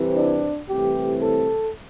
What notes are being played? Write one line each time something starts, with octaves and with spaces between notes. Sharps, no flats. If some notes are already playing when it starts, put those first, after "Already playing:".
Already playing: C2 C3 E3 C4
D4
C2 C3 E3 A3 C4 G4
A4